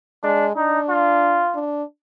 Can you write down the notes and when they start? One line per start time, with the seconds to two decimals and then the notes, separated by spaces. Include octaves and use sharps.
0.23 G#3 D4
0.56 D4 D#4
0.89 F4
1.55 D4